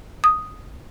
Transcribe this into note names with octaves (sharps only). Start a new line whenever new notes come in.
D#6